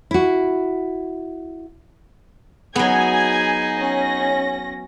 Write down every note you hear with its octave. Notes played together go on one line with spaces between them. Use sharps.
E4 F#4
F#3 B3 D#4 G#4 G#5 G#6
C#4 A#6